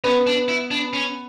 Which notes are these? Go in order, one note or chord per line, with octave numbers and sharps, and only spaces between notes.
B3 C#4
D4
E4
D4
C#4